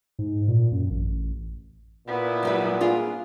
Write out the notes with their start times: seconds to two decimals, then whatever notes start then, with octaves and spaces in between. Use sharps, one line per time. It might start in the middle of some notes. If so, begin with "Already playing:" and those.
0.19 G#2
0.48 A#2
0.72 F#2
0.90 A1
2.07 A#2 B3 E4
2.43 F#3 G3 B4
2.81 D4 F4 G#4